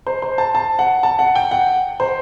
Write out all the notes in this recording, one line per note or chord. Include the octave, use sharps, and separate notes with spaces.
C5
C5
A5
A5
F#5
A5
F#5
G5
F#5
C5